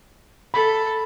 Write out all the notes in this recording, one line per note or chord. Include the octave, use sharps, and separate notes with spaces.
A4 B5